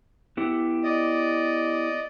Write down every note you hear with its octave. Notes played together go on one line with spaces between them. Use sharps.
B3 E4 G4
D5 D#5